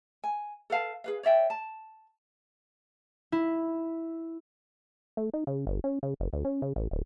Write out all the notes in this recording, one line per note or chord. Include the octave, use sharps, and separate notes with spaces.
G#5
A4 B4 F5 A5
G#4 B4 F5
C#5 D5 E5 G5
A5
E4
A3
D#4
C#3
G1
C#4
C#3
F#1
D2
C#4
C#3
A1
D1